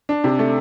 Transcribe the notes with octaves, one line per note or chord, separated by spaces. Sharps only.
D4
C3
A3